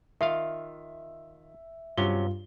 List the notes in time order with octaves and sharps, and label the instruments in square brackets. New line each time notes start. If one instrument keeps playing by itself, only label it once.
[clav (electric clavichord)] D#3 F4 F5 [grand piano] E5
[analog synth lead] G2 [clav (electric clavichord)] C3 F#3 C#4 [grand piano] F4 G7